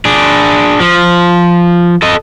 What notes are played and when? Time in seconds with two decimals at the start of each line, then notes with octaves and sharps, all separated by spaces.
0.05 D4 G#4
0.80 F3
2.02 A4 D#5